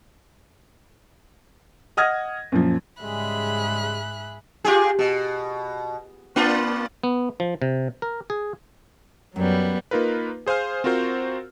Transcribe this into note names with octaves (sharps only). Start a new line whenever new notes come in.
D#5 F#5 D#6 F6 G#6 A#6
F#2 A#2 F3
G#2 C#3 G3 G#3 G#4 E5 B5 F#6
F4 G4 G#4
B2
A#3 D4 F4
B3
F3
C3
A#4
G#4
F#2 F#3 G3 B3
A#3 D#4 F4 A#4 B4
G#4 C5 F5 G#5 F6
C4 F4 F#4 A#4 C5